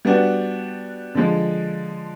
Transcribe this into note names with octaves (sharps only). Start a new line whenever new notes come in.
G3 B3 D4 F#4
D3 F3 G#3